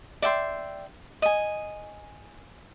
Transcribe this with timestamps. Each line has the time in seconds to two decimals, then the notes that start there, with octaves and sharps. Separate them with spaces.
0.22 D5 E5 G5 C6
1.22 D#5 G#5